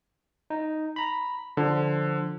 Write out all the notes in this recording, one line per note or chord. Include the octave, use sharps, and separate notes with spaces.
D#4
A#5 B5
D3 F3